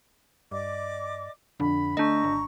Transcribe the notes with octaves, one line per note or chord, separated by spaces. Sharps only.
G2 D5 D#5 D6
F2 D3 B5
A3 D4 D#5 A#5 C#6
G#1